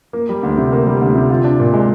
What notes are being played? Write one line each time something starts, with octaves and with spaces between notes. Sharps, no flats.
A#3
G3
D2
C3
A#3
G3
D2
C3
F4
D4
A#2
G#3